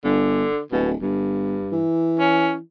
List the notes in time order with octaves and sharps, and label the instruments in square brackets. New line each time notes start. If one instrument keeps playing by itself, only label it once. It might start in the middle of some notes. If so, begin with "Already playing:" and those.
[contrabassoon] G1 [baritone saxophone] D3
[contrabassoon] D1 [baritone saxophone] B2
[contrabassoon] G1 [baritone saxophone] G2
[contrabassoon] E3
[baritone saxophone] C#4